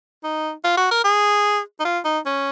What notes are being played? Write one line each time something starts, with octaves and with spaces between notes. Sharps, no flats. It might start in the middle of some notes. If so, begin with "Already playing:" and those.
D#4
F4
F#4
A#4
G#4
D#4
F4
D#4
C#4